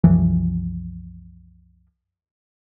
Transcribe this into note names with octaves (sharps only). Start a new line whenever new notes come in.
C2 F#2 E3 F3